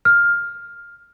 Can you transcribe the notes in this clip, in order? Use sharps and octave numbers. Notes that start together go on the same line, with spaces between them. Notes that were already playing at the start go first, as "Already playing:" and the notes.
F6